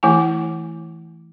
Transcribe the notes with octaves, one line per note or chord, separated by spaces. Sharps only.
E3 A3 E4 G#5